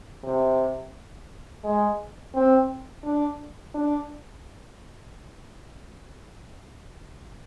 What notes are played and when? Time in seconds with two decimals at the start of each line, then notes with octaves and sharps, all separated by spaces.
0.24 C3
1.64 G#3
2.35 C4
3.05 D4
3.74 D4